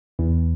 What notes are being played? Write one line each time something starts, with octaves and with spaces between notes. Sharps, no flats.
E2